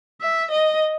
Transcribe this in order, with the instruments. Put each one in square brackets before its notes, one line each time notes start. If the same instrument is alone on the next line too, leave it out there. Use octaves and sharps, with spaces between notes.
[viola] E5
D#5